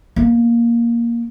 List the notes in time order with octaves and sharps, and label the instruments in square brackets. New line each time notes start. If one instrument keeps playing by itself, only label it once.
[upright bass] A#3